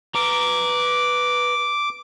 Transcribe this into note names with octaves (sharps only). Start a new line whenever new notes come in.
B4 A#5 D6